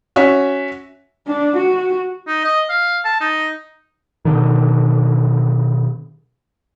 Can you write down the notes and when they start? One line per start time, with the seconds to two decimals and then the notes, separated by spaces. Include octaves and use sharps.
0.16 C#4 F#4 E5
1.27 D4
1.56 F#4
2.27 D#4
2.44 D#5
2.69 F5
3.05 A5
3.21 D#4
4.25 B2 D3 D#3